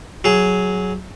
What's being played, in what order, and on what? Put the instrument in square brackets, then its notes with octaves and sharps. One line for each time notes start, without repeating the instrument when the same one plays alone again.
[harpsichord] F#3 G#4